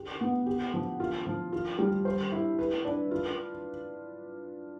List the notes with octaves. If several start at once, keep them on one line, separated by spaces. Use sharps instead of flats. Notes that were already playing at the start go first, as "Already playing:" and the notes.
Already playing: G4
B3
G4
F3
F4
F3
F4
G3
C5
E4
B4
D4
F4